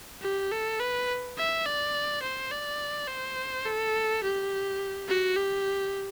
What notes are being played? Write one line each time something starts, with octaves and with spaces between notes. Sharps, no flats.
G4
A4
B4
E5
D5
C5
D5
C5
A4
G4
F#4
G4